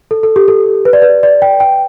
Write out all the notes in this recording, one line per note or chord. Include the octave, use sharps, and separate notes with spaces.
A4
A4
G4
A4
B4
D5
B4
D5
G5
G5